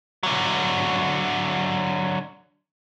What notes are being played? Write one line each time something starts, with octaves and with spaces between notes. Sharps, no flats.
D3 F#3